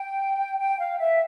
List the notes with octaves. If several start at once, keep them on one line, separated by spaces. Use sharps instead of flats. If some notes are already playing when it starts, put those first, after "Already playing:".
Already playing: G5
G5
F5
E5